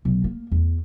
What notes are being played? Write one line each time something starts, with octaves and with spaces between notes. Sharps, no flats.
B1
A#3
E2